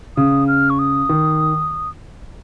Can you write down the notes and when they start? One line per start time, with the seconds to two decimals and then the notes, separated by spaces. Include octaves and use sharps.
0.17 C#3 D#6
0.48 F6
0.70 C#6
0.79 D#6
1.09 D#3